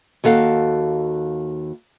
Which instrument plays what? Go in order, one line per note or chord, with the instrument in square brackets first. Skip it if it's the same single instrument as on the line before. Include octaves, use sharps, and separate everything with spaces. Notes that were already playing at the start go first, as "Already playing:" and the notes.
[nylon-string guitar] D#2 F#4 A4 F5